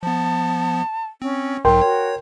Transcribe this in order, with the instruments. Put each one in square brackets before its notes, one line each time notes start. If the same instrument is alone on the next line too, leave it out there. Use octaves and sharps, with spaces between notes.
[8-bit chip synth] F3 B3 [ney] A5
[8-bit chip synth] C4 [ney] C#4
[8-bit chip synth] B1 G#2 F#3 [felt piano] A#4 G5 C6
[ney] F#4 [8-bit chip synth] C#5